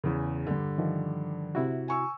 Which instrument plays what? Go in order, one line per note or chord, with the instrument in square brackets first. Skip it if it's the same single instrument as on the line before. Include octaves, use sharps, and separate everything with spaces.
[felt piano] E2 C#3
G2 D3
[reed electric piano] D#3 F3
C3 E4 F#4
[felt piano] G#5 C#6 E6